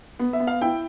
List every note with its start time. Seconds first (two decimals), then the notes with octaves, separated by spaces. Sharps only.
0.19 B3
0.33 E5
0.40 B3
0.47 F5
0.61 E4 G5